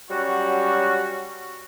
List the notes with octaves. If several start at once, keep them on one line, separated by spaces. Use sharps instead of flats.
F#3 G3 C#4 F#4